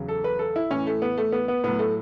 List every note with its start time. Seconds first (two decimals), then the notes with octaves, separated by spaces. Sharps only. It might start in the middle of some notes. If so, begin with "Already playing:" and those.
Already playing: E2 C#3 F#3
0.08 A4
0.24 B4
0.39 A4
0.56 E4
0.70 A2 E3 C#4
0.87 A3
1.02 B3
1.17 A3
1.32 B3
1.48 B3
1.63 A2 F#3 B3
1.79 A3